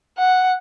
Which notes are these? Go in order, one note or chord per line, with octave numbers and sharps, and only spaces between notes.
F#5